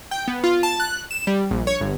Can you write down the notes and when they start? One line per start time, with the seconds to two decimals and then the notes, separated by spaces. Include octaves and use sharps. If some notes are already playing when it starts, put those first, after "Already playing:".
0.11 G5
0.28 B3
0.44 F4
0.63 A5
0.80 F#6
1.11 E7
1.27 G3
1.51 A#1
1.67 C#5
1.81 G1